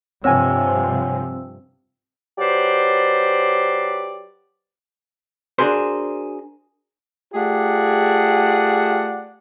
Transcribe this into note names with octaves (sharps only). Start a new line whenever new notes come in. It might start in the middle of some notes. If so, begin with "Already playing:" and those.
G2 C3 F3 C4 C#5 F#5 G#5 E6
F#3 G4 B4 C5 D5
D4 F#4 G#4 A#4 C5
A3 F4 G4 G#4 D5 F#5